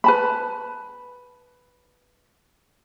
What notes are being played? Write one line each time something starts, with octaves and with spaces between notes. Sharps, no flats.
B4 A5 B5